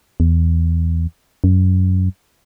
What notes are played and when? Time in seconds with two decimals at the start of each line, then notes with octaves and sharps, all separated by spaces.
0.20 E2
1.44 F#2